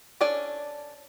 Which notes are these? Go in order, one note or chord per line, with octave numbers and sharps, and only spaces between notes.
C#4 D4 A4 D5 G#5